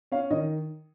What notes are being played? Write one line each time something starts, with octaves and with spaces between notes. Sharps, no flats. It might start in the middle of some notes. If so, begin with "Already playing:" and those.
C#4 F5
D#3 D#5